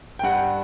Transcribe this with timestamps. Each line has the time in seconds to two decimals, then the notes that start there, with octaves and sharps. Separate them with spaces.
0.19 G5
0.23 G2 F#5